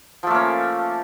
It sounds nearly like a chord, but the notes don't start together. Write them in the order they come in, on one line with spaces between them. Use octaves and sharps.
F3 A3 A#3 C#4